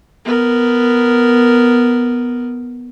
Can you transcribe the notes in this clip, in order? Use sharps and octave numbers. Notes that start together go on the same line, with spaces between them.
B3 A#4